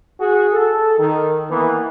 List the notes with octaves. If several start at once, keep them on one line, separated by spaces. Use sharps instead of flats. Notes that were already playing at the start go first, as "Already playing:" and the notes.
F#4 G#4
A4
D#3
E3 A#3 B3